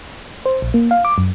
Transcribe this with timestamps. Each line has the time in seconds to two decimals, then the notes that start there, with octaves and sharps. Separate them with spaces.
0.46 C5
0.62 A#1
0.74 A#3
0.91 F5
1.05 D6
1.18 F#2